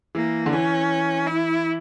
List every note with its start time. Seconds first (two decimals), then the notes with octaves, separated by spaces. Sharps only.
0.15 E3 A#3
0.46 D3
0.52 E3 C#4
1.27 E4